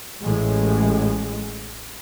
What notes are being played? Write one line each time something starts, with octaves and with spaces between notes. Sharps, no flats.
A1 A2 G#3